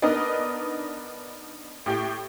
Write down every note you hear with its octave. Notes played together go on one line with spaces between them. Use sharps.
B3 D4 D#4 A#4 B4 D#5
A2 G4 G5